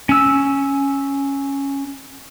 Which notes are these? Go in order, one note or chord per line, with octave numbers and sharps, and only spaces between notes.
C#4 E6